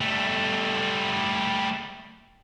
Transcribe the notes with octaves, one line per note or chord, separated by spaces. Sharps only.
G3 A3